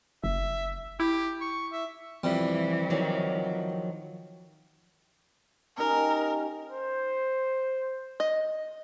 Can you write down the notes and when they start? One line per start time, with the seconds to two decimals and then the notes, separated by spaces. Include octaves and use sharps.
0.24 F#1 E5
1.00 E4 G4
1.41 C#6
1.72 E5
2.24 F2 C3 E3 F3 G3
2.90 D#3 F#3
5.78 C#4 D#4 G4 A#4
6.71 C5
8.20 D#5